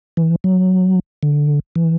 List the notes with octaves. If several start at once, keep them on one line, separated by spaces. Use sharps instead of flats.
E3
F#3
D3
E3